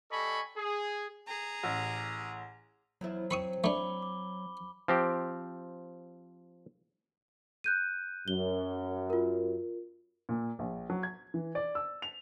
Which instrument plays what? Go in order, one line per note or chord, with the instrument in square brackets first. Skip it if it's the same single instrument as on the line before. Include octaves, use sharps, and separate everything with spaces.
[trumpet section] G3 A4 D#5 G#5 B5 C#6
G#4
[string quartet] G#4 A#5
[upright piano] A1
[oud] E2 F3 E4 [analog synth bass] F#3
[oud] C4 [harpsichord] B5 C#6 D#6
[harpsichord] A3 D4 [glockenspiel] B5 D6 G7
[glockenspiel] D6
[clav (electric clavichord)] F3 C4 G4
[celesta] F#6 G6 D#7
[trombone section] F#2 [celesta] G7
[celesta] F4 A#4
[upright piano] A#2
A#1
F#3
G#6
E3
D5
E6
F7